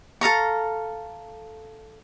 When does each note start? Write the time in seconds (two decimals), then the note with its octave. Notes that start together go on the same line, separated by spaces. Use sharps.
0.21 A4 F5 A#5 C#6